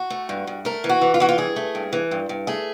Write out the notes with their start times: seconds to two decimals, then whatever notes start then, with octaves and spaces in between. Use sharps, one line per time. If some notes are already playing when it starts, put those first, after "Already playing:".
Already playing: F#4
0.10 A3
0.29 G2
0.47 G2
0.65 A3 A#4
0.84 E3
0.89 F#4
1.01 E3
1.14 F4
1.20 E3 F#4
1.29 F4
1.38 G2 G#4
1.56 A3
1.75 G2
1.93 E3
2.11 G2
2.29 G2
2.47 A3 G#4